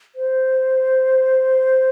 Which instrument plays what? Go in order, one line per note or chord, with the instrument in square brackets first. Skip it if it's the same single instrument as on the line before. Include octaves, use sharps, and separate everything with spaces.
[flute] C5